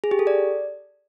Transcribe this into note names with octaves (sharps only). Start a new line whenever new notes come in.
G#4
G4
A4
D5